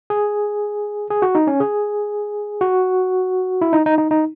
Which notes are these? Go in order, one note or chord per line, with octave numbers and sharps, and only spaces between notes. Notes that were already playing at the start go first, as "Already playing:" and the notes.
G#4
G#4
F#4
D#4
C#4
G#4
F#4
E4
D#4
D#4
D#4
D#4